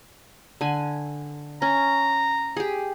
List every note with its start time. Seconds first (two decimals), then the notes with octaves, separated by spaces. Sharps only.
0.61 D3 G#5
1.62 C#4 A#5
2.57 G4 G#4